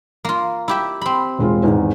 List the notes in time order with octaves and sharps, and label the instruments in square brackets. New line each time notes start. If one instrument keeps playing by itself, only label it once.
[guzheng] A#3 F4
E4 G4 E5
C4 B5
[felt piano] E1 G#3 F4
E2 G#2 D#3